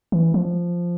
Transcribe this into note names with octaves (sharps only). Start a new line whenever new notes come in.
E3
F3